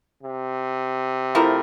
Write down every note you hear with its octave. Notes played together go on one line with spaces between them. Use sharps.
C3
F3 A3 E4 A#4